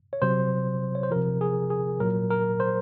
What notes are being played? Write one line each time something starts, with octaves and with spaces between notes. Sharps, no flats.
C#5
C3 F#3 C5
C#5
C5
C3 F3 A#4
G#4
G#4
A#2 F#3 A#4
A#4
C5